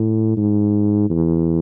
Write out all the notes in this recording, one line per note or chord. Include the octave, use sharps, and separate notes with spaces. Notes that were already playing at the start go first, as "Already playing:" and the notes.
Already playing: A2
G#2
E2